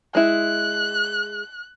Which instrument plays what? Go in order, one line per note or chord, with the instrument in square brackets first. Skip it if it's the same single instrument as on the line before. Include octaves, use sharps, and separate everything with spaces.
[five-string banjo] G#3 E4 [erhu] F#6